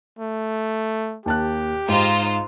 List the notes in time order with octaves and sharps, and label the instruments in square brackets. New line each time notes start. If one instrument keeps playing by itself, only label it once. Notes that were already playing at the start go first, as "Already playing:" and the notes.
[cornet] A3
[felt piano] D#2 A5 F#6 [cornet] G4
[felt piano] G#2 [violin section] D#4 F4 C5